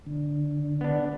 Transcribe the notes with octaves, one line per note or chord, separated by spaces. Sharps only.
D3
B3 D4